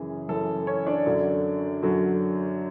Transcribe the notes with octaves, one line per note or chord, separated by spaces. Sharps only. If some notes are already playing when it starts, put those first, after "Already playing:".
Already playing: F#2 C#3 E3 G#4
F#2 C#3 E3 A4
C#4 C#5
D4 D5
F#2 D3 F#3
F#2 D3 F#3